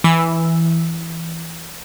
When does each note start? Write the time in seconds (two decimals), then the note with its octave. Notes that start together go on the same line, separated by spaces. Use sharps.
0.04 E3 E6